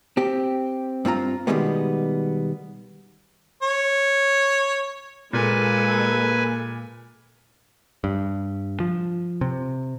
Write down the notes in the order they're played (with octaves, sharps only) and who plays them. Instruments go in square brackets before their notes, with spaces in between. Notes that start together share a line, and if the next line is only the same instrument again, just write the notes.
[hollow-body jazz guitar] C4 G4
G2 C4 F4 A#5
B2 D#3 G3 G#3 B3
[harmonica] C#5
[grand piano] A#2 [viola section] G#3 A4 [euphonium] A#3 [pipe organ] B4 G#5
[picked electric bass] G2
F3
C3